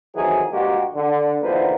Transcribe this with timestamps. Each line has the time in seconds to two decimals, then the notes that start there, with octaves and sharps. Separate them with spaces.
0.15 F2 D#3 E3 F#3 G#4
0.51 A#1 G2 G#3 A#3 F#4 G4
0.94 D3
1.42 E2 D3 F3 A#3 D#4 B4